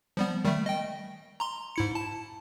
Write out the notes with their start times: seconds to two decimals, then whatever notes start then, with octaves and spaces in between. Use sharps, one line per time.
0.17 F3 G3 B3
0.45 D#3 G3 A3
0.66 D#5 G5
1.40 A#5 C6
1.76 G#2 E4 C#7
1.95 A5